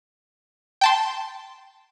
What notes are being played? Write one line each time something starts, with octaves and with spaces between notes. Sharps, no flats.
G5 A5 C6